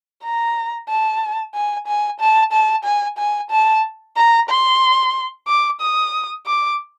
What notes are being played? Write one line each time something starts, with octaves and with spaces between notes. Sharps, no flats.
A#5
A5
G#5
G#5
A5
A5
G#5
G#5
A5
A#5
C6
D6
D#6
D6